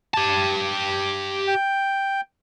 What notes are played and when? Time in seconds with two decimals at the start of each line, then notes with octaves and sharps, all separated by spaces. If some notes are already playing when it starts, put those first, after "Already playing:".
0.14 G4 A5
1.48 G5